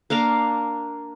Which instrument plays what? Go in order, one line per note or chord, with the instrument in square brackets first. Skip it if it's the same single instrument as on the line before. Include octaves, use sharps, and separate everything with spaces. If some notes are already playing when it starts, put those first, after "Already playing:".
[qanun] A#3 D4 A#4 F5